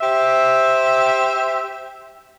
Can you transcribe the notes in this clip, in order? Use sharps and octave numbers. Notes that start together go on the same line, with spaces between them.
G4 C5 E5